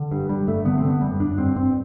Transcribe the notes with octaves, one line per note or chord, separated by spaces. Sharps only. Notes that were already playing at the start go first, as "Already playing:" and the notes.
Already playing: D3
G2
G2 G3
G2 A3
D3 B3
C4
D3
B3
F#2 G3
F#2 D4
G2 C4
G2 C4